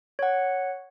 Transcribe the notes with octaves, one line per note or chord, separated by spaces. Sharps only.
C#5 F#5